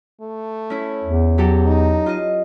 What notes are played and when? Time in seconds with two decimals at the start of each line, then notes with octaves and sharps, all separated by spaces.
0.21 A3
0.70 C#4 E4
1.04 E2
1.38 F#3 G4 A4
1.67 D#4
2.06 F4 D#5